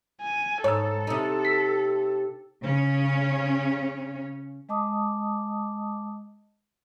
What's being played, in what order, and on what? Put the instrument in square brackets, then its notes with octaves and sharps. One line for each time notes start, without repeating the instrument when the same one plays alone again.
[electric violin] G#5
[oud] G#2 [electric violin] A4 [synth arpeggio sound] C#5 E6
[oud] C3 D#4
[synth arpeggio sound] B6
[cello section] C#3 C#4
[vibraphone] G#3 D#5 A5 D6 D#6